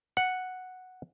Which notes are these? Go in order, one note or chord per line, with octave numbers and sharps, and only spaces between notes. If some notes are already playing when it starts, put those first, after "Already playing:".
F#5